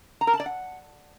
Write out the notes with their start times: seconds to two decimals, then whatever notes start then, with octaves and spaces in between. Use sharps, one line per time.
0.21 A#5
0.27 A#4
0.33 A5
0.40 D5
0.46 F#5